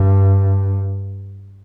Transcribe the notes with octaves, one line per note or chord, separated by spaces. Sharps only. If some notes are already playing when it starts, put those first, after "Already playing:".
Already playing: G2